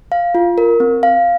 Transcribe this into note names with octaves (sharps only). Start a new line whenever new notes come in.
F5
F4
A#4
C4
F5